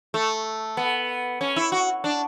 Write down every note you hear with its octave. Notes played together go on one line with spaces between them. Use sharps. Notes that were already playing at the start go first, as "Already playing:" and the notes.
A3
B3
C#4
E4
F#4
D4